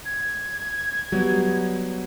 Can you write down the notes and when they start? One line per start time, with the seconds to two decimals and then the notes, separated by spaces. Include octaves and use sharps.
0.05 G#6
1.12 F#3 G3 B3